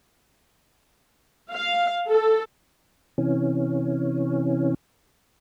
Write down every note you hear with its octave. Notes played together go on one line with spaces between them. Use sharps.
F5
A4
C3 E3 C#4